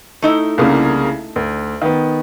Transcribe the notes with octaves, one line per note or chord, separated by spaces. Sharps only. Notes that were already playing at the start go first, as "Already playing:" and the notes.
A3 D#4 E4
C2 C#3 A#3
D2
D#3 B3